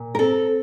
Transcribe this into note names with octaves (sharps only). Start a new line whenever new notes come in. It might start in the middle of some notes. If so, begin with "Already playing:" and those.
Already playing: A#2
A#4
C4 A4